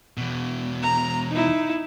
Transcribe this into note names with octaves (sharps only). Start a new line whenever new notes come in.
E2 B2
A#5
D#4 E4